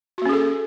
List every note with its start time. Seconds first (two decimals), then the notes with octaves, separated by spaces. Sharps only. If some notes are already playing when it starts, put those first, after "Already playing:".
0.18 F#4
0.22 A#3
0.25 C#4
0.29 G#4
0.33 A4